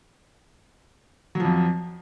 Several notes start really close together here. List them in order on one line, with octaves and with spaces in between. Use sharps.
F#3 F3 F2